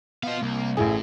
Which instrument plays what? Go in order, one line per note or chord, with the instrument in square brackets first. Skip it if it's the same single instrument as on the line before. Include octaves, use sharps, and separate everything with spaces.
[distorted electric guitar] B3 D#5 [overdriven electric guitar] C5 F5
[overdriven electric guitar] C2 [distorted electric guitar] A#3
[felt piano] A1 E4 G#4 [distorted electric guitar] A2